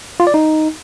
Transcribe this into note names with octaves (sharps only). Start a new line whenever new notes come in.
F4
D5
D#4